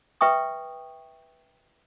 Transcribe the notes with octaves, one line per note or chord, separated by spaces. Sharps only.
B4 E5 G5 C#6 D#6